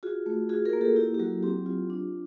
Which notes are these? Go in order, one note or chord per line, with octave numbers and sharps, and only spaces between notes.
F4 F#4 G#4
A3
F4 F#4 G#4
G#4 A#4
A#3
G4 A4
E4 G4
G4
F#3 F#4
C4 G4
F4
D4